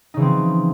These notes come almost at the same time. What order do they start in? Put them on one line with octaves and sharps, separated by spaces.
D#4 C#3 E3 C4 F3